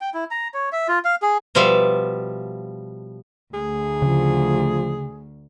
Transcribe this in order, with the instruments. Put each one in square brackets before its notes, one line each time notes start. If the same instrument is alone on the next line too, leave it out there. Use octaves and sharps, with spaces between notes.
[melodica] G5
E4
A#5
C#5
E5
F4
F5
G#4
[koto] B2 F3 G3 E5 F5
[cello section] D2 [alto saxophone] G#4
[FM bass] C#3 [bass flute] F3